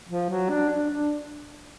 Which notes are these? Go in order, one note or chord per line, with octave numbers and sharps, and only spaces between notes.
F3
F#3
D4
D4
D4